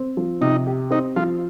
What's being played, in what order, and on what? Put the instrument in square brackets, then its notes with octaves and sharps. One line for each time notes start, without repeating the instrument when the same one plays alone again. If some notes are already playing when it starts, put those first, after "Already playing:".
Already playing: [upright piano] C4
F3
[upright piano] C3 [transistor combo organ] D#4
[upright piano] G4
[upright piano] C4 [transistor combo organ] D#4
[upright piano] F3 [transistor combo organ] F4